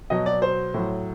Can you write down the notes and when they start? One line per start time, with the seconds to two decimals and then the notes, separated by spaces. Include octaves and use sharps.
0.10 B2 F#3 D#5
0.26 D5
0.42 C5
0.74 A2 F#3